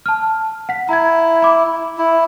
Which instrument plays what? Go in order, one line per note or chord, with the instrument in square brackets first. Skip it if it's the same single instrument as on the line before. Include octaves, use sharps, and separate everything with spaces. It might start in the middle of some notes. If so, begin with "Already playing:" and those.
[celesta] A5 F6
F#5 B6
[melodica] E4 [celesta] A#5 G#6
[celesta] B5 D6
[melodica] E4